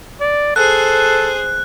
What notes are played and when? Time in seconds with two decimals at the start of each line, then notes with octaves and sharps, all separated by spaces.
0.20 D5
0.56 G#4 A4 C5 F#6